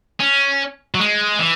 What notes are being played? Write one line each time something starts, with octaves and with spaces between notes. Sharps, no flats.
C#4
F#3
G#3
E3